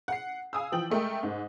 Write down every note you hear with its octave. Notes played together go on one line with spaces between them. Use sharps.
F#5 C7
F5 G#5 D#6 E6
E3 F3 G5 F#7
G#3 A3 A#4 G5
G#2